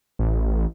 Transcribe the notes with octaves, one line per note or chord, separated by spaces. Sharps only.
A1